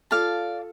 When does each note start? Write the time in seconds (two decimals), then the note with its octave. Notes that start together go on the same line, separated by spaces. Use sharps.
0.11 F4 A4 D5 F5 A5